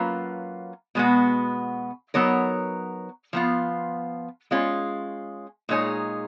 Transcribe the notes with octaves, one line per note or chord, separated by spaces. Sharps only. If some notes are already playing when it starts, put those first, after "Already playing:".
Already playing: F#3 A#3 C#4 F4 B4
B2 G#3 B3 F#4
F#3 B3 D#4 A#4 C#5
F3 B3 F4
G#3 C#4 F4
A#2 G#3 D#4 G#4 C#5